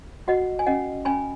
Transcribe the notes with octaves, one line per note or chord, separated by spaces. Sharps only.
F#4 D#5 F#5
G#5
C#4 D#5 F#5
C#4 G#5 B5